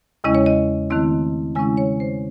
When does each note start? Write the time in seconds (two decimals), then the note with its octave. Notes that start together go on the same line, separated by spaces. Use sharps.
0.24 E2 C#3 G#3 C#4 E4 D#5
0.35 C#5
0.46 D#5
0.90 D#3 A3 C4 E4
1.55 C#3 G#3 C#4 E4 G#5
1.77 C#5
2.00 C5